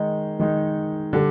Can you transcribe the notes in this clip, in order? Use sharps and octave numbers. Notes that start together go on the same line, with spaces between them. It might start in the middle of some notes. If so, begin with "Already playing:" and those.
Already playing: D#3 G#3 D#4
D#3 G#3 D#4
D3 G3